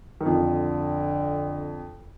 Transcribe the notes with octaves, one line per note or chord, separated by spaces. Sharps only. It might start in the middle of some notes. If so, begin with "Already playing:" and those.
D#3
F2 D3 F3